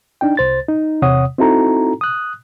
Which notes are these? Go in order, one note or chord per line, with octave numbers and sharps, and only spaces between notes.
D4 D#4 G5
C2 C5 A6
D#4
E2 C3 C#5 F#5 D#6
C4 D#4 E4 F#4 A4 A#5
D#6 F#6